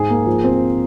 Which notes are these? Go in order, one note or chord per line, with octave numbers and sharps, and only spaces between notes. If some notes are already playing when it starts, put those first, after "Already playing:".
Already playing: G#2 G#3 G#4
A#3
F3
C4